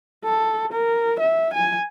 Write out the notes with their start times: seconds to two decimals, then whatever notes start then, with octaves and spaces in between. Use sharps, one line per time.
0.25 A4
0.73 A#4
1.20 E5
1.54 G#5